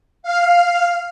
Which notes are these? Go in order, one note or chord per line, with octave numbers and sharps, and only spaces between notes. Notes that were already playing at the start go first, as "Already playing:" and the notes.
F5